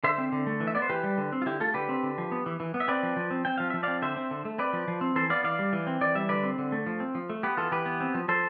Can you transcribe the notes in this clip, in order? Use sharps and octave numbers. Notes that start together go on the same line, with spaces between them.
D3 C5 E5
C4
D3
A3
E3
E5
B3 D5
C5
E3 G4 B4
G3
D3
C4
F4
D3 E4 G4
A3 F4 A4
D3 G4 B4
C4
D3
F3
B3
E3
E3
B3
E5
C4 B4 D5
F3
F3
C4
C4 G5
F3 F5
F3 E5
C4 D5 F5
D3 C5 E5
C4
D3
A3
C4 B4 D5
F3
F3
C4
E3 A4 C5
B3 D5 F5
E3 D5 F5
G3
E3
C4
E3 D5
G3 E5
D3 B4 D5
C4
D3
A3
F3
C4
F3
A3
B3 G4 B4
E3 F4 A4
E3 G4 B4
B3
C4
F3
F3 A4 C5